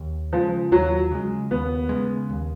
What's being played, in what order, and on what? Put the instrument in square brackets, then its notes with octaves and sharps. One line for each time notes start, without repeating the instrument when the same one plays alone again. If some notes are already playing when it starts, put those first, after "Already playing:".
Already playing: [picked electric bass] D#2
[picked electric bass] C#3 G#3 [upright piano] F3
[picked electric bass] D#2 [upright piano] F#3
[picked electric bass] C#3 G#3
[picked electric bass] D#2 [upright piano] B3
[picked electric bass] C#3 G#3
D#2